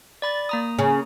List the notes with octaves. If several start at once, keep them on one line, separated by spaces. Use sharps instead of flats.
D5 B5 A6
A#3 A#5 D#6
C#3